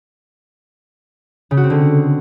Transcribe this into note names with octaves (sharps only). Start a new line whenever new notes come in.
C#3
F#4
C4
D3